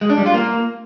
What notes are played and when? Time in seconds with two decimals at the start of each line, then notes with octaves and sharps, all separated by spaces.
0.01 G#3
0.10 D4
0.18 G3
0.26 F4
0.34 A#3